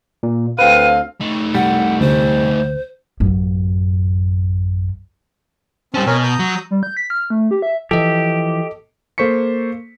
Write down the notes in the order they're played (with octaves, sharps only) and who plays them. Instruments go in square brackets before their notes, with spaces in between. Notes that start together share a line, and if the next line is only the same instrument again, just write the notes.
[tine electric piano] A#2
[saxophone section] D2 C4 F5 [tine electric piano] B4 G5 [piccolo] D#7
[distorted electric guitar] A3 D#4
[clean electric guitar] C2 G3 [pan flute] F#5
[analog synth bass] D2 [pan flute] C5
[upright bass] A1 F#2
[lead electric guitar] G3 C#4 [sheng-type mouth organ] C4 A5
[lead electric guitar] B2 [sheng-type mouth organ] A#4 C#5 G#5
[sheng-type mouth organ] A#5 D#6 G6
[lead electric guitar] F#3
[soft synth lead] G3
G6
B6
F6
A3
G4
E5
[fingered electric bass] E3 F3 [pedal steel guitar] G4 [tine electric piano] A4 D#5
[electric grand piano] A#3 A4 C5 C#6 B6 C#7